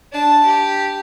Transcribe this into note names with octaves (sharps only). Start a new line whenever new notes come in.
D4 A5
G4